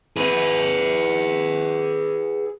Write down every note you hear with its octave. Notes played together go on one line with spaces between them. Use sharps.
G#4 B4